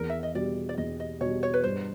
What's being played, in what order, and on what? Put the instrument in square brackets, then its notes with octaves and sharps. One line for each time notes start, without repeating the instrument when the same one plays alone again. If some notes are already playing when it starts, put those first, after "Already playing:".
Already playing: [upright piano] E2 [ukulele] A#4
[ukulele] E5
D#5
[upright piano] B2 G3 [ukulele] D5
[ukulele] D5
[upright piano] E2 [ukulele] D#5
[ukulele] D#5
[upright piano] B2 G3 [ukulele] C#5
[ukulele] C#5
B4
[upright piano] G2 [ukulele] C5